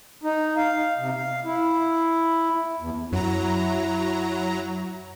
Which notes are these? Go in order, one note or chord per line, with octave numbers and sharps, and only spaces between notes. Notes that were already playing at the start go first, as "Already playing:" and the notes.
D#4
F5
C3
F5
E4
E2
F#2 F#3 E4 A#5